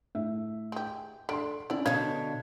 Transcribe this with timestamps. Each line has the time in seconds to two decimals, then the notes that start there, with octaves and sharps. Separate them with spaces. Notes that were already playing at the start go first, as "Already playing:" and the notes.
0.15 A2 E5
0.72 G#3 G4
1.29 A3 D4 C6 D7
1.70 C#4 D4 E4 D5
1.86 B2 D3 C#5 D#5 F5 G#6